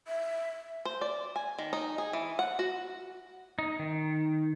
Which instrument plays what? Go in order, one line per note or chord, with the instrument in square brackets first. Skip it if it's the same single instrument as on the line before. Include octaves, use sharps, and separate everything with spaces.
[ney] E5
[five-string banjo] C5
D5
G#5
D#3
D#4
G#4
E3
F#5
F#4
[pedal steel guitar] D#4
D#3